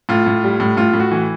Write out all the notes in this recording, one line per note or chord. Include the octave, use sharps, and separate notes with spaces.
A2 F4
A2
G3
A2
A2 F4
A2
F#4
E3